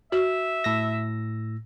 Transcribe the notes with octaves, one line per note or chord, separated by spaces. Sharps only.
F#4 E5
A2 E6 A#6